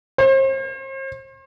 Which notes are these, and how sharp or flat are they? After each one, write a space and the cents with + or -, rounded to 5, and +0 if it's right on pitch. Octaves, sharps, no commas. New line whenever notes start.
C5 +40